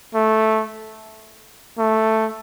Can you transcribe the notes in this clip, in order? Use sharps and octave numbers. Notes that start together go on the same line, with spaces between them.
A3
A3